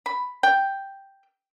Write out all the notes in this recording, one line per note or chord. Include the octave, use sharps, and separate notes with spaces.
B5
G5